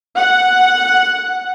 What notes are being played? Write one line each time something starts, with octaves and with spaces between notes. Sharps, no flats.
F#5